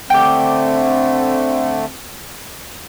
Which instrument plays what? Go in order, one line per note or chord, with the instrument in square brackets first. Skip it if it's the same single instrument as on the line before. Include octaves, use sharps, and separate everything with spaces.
[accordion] D3 A3 [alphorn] C4 [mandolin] G5 D6